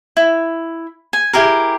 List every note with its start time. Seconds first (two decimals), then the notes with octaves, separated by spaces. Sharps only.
0.17 E4
1.13 G#5
1.33 E4 G4 G#4 A#4